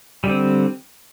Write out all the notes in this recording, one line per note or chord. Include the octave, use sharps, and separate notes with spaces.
D3 G3 C4